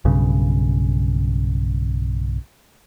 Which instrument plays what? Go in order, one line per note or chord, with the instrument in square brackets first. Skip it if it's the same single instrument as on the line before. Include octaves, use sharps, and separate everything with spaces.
[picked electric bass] B1 G2 C#3